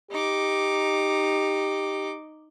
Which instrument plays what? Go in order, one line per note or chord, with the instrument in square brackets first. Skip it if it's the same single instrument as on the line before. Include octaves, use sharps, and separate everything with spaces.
[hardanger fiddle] D#4 D6 [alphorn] G4